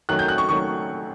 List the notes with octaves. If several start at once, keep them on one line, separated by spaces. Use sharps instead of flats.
F#2 D#3 F#3 A3 F#6
G6
F#6
C#6
D#3 F#3 A3 C#6